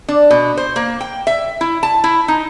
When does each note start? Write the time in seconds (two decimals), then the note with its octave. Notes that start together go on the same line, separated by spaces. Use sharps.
0.08 D4
0.30 B2
0.57 C5
0.76 A#3
1.01 G5
1.27 E5
1.61 E4
1.83 A5
2.04 E4
2.28 D#4